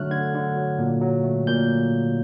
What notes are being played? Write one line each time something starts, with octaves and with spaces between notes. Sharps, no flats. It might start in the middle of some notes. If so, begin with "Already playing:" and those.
Already playing: D3 F#3 A3 F6 F#6
D3 G#6
D3
F#3
A#2
F#3
A3
A#2 G6